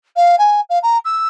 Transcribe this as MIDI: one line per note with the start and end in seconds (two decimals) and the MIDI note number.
0.16 0.35 77
0.38 0.60 80
0.69 0.78 77
0.83 0.98 82
1.05 1.28 88